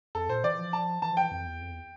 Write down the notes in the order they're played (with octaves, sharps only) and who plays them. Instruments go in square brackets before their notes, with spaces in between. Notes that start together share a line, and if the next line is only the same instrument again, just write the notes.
[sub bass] F2 [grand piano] A4
[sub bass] A#2 [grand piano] C5
[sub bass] E3 [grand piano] D5
[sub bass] F3
[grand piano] A5
[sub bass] E3 [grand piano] A5
[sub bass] F3
[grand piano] G5
[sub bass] E3
F2
E2
F2
E2